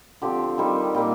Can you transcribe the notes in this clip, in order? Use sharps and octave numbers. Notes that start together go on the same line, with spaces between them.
D3 F3 C4 G4
D#3 G3 C4
A#2 G3 A#3